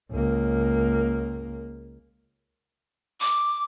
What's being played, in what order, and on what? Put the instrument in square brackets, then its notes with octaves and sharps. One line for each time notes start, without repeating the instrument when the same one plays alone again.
[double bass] C#2 A#3
[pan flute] D6